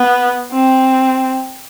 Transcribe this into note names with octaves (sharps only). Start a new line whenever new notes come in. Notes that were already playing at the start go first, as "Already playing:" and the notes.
Already playing: B3
C4